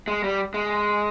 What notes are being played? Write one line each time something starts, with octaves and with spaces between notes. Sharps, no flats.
G#3
G3
G#3